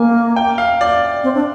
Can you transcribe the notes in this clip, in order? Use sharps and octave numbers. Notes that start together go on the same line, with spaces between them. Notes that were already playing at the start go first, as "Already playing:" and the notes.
Already playing: A#3 G#5
G5
F5
D5
C4
D4